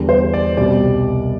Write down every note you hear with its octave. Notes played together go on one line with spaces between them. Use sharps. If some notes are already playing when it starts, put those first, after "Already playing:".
Already playing: E2 D3 G3
C5
D5
C2 B2 G3 D5